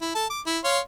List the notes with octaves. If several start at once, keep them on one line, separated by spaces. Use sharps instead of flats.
E4
A4 A5
D6
E4
C#5 F5 C6